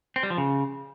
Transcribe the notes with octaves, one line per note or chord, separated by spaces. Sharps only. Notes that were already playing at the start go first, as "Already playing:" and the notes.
C4
G3
F3
C#3